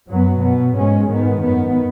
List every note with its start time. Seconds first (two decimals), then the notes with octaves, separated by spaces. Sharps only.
0.10 F#2 F#3 B3
0.43 B2 B3
0.77 G#2 G#3 C#4
1.10 G#2 D#3 B3
1.43 F#2 D#3 B3